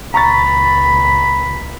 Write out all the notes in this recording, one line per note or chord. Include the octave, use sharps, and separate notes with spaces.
C#2 A#2 A#5 B5 C#6 A6